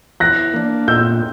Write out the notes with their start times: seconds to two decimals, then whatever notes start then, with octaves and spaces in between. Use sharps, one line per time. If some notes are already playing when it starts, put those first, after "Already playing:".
0.20 E3 F#6 A#6
0.54 A#3 D4
0.88 A#2 E6 G6